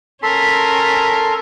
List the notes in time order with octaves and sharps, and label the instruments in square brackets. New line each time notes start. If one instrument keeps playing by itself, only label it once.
[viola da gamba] C#4 A#4 [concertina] A4 C6 [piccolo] B6